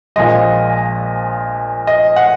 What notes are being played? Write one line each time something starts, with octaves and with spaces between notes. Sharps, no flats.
A#1 A#2 F3 G#3 D#5
D#5
F#5